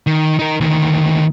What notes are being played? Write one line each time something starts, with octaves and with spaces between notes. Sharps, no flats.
D#3
D#4 A#4
D2 D#3